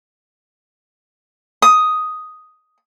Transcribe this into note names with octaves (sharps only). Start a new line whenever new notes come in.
D#6